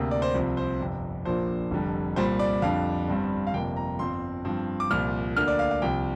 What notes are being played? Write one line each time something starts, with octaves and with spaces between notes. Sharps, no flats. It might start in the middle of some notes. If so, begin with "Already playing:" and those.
Already playing: D2 C3 A#3
D5
C5
C2 C3 F3 C4
C5
G1 F2 C3
A#1 A#2 F3 A#3 D4 C5
F1 F2 D3 G3
C2 A#2 G3 C5
D5
F2 D3 G3 D4 F5
G1 G2 G3 C4
F5
G1 F2 C3 A#3 G5
A#5
G1 F2 F3 C4 C6
G2 F3 C4
D6
C2 A#2 F3 F6
D2 D3 A#3 D4 F6
D5
F5
F5
C2 C3 F3 G5